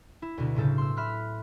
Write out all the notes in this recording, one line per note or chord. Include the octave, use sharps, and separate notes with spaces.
E4
D2 B2 D3
B1 A2 C#3 A4 G6
C6 E6
E5 B5 F6 F#6